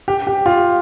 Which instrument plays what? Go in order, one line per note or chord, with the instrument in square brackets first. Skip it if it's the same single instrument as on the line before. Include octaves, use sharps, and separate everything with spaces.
[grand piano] G4
G4
F4